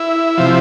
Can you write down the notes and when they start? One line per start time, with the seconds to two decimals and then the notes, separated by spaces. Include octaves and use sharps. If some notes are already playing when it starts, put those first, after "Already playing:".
Already playing: E4
0.38 C3 F3